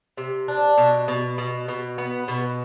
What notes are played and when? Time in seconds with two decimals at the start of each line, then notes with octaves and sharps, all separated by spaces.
0.17 C3
0.48 D4
0.78 B2
1.08 B2
1.38 B2
1.68 B2
1.98 B3
2.28 B2